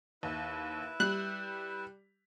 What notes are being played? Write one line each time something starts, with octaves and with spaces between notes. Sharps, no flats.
D#2 E4 B4 E5
G3 F#6